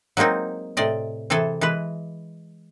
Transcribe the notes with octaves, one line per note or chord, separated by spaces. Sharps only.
F#3 G#3 A#3 C4 D#4
A2 C3 D5 D#5
C3 E3 G#4 A4 G#5
E3 G#3 B4